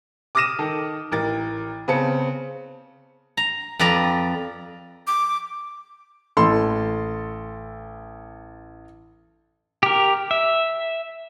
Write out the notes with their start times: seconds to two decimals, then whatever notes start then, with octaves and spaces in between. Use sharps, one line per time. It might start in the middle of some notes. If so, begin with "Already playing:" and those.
0.35 D6 D#6 F6 A#6 D#7 E7
0.59 D#3 A4
1.12 A1 A#4 A6
1.88 C#3 B3 C4 A5 C#7
3.37 A#5
3.79 F2 B4 D5 A#5
5.07 D6
6.37 A1 A4 C6
9.83 G4 A#4
10.31 E5